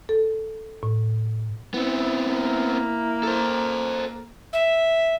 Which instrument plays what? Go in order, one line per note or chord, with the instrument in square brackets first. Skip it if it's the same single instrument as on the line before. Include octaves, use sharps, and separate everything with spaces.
[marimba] A4
A2
[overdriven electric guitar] B3 C4 [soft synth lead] E4
[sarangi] A#3
[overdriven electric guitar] A4 C5
[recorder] E5